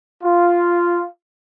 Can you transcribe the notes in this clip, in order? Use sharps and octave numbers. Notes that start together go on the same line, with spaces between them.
F4